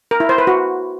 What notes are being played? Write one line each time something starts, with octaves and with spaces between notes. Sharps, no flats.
A#4
E4
C5
B4
F#4